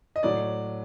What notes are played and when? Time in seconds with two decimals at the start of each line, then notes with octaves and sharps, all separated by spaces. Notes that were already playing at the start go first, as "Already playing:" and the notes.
0.16 D#5
0.23 A2 F#3 D5